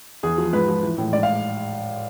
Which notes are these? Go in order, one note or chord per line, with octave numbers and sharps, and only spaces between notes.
E2 G#4
F3
G#2 B4
F3
E3
A2
G#2 D5
F5